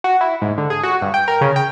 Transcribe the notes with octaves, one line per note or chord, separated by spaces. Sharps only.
F#4
E4
G#2
D3
G#4
F#4
G2
G5
A#4
C#3
G5